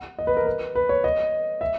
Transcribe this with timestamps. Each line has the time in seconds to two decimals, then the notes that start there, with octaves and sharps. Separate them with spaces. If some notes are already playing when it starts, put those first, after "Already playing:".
Already playing: F#5
0.19 D#5
0.27 B4
0.37 A#4
0.47 B4
0.75 B4
0.89 C#5
1.04 D#5
1.61 E5